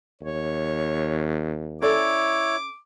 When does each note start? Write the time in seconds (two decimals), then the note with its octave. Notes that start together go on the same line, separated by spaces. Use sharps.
0.22 D#2 C#5
1.82 C#4 E4 A4 C#5 D5 D6